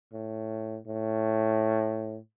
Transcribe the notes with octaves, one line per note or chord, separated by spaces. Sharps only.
A2
A2